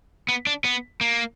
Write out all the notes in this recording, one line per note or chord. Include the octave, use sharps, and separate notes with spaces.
B3
D4
B3
A#3